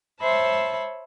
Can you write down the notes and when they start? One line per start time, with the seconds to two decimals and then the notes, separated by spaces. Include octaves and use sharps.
0.20 C5 C#5 E5 A5 B5